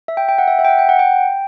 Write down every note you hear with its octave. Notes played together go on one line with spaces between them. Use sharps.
E5
G5
G5
F#5
E5
E5
G5
F#5
G5
F#5
G5